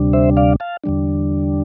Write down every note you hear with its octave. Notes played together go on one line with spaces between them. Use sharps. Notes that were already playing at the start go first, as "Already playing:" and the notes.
Already playing: D2 C3 G3 D4
C5 E5
D5 F5
F5 A5
E2 D3 G3 D4